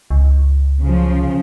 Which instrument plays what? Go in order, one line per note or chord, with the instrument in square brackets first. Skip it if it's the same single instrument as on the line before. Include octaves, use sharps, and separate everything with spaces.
[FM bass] C#2
[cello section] C#3 F3